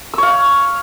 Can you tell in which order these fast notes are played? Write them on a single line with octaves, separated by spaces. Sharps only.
E6 C#5 F5